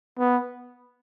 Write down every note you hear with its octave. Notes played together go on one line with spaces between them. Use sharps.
B3